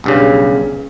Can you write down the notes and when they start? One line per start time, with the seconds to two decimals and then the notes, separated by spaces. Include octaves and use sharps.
0.04 B1 G2 C#3